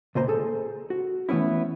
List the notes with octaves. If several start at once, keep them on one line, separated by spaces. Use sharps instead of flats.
C#2 A#2 C5 A#5
G#4 A4
F#4
E3 A3 B3 C#4 E4